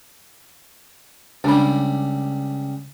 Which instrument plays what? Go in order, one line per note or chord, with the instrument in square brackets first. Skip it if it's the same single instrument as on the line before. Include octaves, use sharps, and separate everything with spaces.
[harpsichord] C#2 G3 [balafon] D4 B5